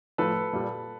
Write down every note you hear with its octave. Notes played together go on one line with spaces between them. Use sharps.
A2 F3 A3 A4 B4
A#2 G3